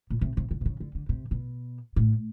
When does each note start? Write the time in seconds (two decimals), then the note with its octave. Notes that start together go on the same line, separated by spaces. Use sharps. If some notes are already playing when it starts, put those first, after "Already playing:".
0.10 A#2
0.21 C3
0.37 C3
0.51 C#3
0.61 C3
0.65 C#3
0.80 D3
0.95 D3
1.09 C3
1.31 B2
1.96 A2